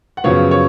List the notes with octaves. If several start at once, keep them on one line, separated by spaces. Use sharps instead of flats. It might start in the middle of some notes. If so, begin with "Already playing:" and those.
F#5
F#2 C#3 F3 B3 C#5 F5
C#5